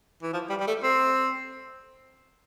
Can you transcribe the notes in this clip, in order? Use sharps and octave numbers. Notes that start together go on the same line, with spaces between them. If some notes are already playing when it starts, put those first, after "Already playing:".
E3
F3
G3
G3
A3
C4